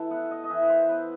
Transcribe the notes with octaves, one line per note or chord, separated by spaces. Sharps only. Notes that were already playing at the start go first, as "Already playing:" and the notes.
Already playing: E3 A4 E5
B3 F#5
D#5
D#5
E3 E5
B4
C5
B3 B4